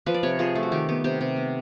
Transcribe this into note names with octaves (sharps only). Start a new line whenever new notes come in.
F3 B4
D5
C3 C#5
F3 G#4
A3
F#4
D#3 G4
B3 G4
C3 G4
C3
B3